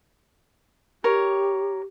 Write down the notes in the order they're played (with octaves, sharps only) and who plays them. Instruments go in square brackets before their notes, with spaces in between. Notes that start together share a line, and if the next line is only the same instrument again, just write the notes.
[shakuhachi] G4 [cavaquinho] A#4 C#5